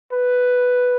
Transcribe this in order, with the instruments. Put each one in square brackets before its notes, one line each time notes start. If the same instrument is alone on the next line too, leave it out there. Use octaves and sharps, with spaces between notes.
[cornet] B4